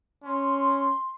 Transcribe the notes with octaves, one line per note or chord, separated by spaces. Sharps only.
C#4 C6